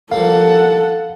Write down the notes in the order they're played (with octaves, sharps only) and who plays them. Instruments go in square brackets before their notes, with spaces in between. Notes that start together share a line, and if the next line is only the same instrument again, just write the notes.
[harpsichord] F3 G3 A#3 [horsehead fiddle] A4 F#5 [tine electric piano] F5